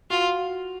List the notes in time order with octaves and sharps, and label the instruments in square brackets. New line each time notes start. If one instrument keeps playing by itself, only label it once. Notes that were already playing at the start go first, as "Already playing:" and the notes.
[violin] F4 [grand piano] F#4